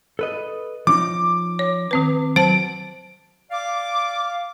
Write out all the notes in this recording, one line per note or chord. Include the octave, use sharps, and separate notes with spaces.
A4 B4 D#5
F3 C#4 D#4 D6
C#5
D#3 C4 B4
F#3 C5 A5 D7
D5 F5 D6